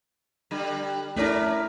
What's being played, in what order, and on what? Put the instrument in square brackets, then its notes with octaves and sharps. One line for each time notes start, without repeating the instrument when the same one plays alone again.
[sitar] D3 G3
[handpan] A3 E4 [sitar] C#4 D4 A#4